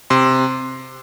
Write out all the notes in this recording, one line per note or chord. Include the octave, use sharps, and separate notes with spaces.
C3 C6